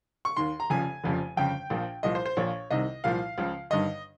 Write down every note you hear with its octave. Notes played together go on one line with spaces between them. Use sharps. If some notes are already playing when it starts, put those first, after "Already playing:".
C#6
D#2 D#3 C6
A#5
F1 F2 C#3 F3 G#5
F1 F2 C#3 F3
G1 F2 C#3 G5
A#1 A#2 F3
C2 A#2 F3 D#5
C5
C5
A#1 A#2 F3 C#5
C2 C3 D#3 D#5
C2 A#2 F3 F5
C#2 C#3 F3
G1 G2 D#3 D#5